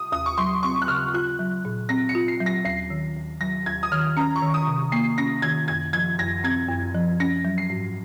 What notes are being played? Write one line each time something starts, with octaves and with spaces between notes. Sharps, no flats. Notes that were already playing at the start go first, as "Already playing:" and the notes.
Already playing: D#6
D#2 D#6
C#6
F#3 C6
C4 C#6
F#6
C#3 F6
F4 F#6
F#3
A#2
C4 A#6
C#7
F4
C7
F#3
A#6
D#2 C7
D#3
D#2
F#3 A#6
D#2 G#6
D#6
D#3 F6
C#4 A#5
C#6
D#3
D#6
C3
A#3 C7
C#4 A#6
D#3 G#6
F#2 G#6
F3 G#6
F#2 A#6
C4 G#6
F#2
F3
C#4 A#6
F#3
C7
G#2